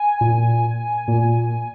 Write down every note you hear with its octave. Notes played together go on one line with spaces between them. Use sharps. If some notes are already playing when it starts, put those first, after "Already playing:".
Already playing: G#5
A#2
A#2